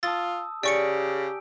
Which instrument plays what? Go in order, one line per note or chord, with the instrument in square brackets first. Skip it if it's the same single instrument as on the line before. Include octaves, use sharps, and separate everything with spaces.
[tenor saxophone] F4 [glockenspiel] A5 D#6 E6 [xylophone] A6
[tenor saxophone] C#3 [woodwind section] G4 [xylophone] D5 C#6 C#7 [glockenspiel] G#5 D7